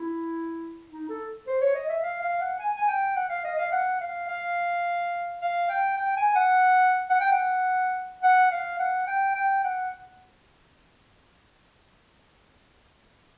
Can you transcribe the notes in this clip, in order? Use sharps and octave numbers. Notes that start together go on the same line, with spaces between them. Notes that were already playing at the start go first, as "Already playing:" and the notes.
Already playing: E4
D#4
A4
C5
C#5
D#5
E5
F5
F5
F#5
G#5
G#5
G5
F#5
F5
D#5
F5
F#5
F5
F5
F5
G5
G5
G#5
F#5
F#5
G5
F#5
F#5
F5
F#5
G5
G5
F#5